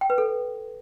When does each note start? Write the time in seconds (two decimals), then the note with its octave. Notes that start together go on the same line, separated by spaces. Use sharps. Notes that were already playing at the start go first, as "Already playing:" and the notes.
0.01 G5
0.10 B4
0.18 A4